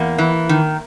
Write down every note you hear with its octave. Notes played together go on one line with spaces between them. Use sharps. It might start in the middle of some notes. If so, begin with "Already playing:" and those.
Already playing: E2 A#3
E3
D#3